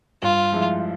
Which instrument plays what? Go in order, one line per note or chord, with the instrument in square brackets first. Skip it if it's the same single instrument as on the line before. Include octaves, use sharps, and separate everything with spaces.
[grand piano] G2 [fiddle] F4
[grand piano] F3 G#3 E4